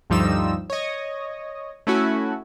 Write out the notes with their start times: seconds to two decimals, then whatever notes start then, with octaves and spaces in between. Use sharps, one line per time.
0.10 D2 G2 F3 G3 D#4 E6
0.70 C#5 D#5
1.87 A3 C#4 E4 F#4